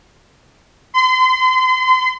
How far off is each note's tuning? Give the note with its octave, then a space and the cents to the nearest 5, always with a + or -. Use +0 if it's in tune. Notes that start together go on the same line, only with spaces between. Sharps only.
C6 -35